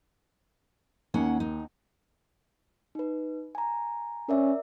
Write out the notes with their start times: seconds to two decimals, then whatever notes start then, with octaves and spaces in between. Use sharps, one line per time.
1.14 D#2 A#3 C#4 F#5
1.40 D#4
2.95 D#4 B4
3.55 G#5 A#5
4.29 C#4 A#4 D5 E5